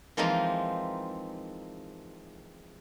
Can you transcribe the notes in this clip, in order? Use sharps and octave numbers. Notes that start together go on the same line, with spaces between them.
E3 F3 G#3 A#3 C4 D#4